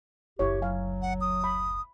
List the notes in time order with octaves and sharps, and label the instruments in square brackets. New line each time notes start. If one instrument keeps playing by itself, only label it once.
[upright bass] F#1 D2 [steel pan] E4 C#5 [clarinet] G4
[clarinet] F#3 [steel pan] F5 G#5
[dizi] F#5
D#6
[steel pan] B5